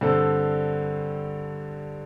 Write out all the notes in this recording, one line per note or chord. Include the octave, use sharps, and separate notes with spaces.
G2 D3 C4 A4